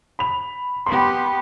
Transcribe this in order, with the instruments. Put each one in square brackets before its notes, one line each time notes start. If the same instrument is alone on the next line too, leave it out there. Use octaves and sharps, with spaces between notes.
[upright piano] B5 F7
[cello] B3 G4 [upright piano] B5 C6